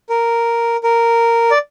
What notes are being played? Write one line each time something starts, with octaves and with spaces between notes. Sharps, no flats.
A#4
A#4
D5